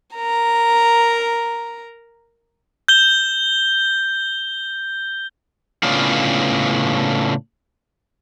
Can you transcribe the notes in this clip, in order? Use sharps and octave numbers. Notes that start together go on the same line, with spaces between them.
A#4 A#5
G6 G7
A2 C#3 B3 C#4 D4 F4